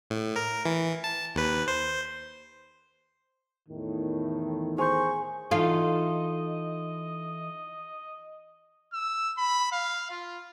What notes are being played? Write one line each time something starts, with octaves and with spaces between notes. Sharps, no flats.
A2
A#4
E3
A5
D#2 B4
C5
E2 A2 D#3
G#4 C5 C6 C#6 G6
E3 D#4 F4 A4 D#5
E6
B5
F5
F4